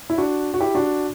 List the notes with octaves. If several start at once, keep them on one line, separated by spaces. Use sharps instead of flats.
E4
D4 F#4
F#4
E4 G4
D4 F#4